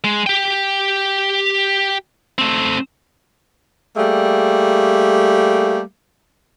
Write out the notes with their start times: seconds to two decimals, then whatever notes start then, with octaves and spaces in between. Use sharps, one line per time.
0.04 G#3
0.27 G4 G5
2.38 A3 C4
3.97 G3 A3 A#3 G#4